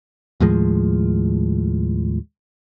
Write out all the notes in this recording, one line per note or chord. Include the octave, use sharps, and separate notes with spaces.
D#2 A2 F3 G#3